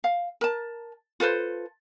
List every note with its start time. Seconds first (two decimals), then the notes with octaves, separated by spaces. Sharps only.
0.04 F5
0.41 A#4 A5
1.20 F4 A4 B4 C5